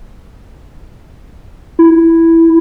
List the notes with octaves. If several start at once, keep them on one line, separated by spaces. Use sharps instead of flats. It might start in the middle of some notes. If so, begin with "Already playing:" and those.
E4